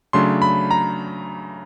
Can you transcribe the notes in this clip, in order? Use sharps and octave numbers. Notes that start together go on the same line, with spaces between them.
C#3 F#3 A3 D4 C6
B5
A#5